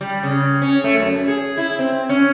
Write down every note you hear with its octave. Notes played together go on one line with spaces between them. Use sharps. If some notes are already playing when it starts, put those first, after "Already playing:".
G3
C#3
C#4
A3
F#2
G#4
E4
C4
C#4